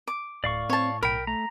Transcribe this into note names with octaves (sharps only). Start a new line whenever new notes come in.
D6
D1 A2 D5 F5 C#6
C4 C#5 A5
B1 A#4 G5 B5
A3 A#5